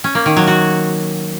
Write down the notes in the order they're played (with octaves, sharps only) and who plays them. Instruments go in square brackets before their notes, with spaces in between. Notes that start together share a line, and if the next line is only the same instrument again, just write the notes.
[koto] C#4
A#3
D#3
F#3
F#4